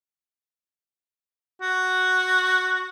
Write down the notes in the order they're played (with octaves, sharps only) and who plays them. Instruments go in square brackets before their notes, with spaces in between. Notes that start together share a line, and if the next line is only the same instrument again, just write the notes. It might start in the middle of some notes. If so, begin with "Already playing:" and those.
[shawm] F#4